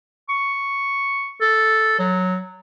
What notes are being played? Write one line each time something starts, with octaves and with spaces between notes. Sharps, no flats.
C#6
A4
F#3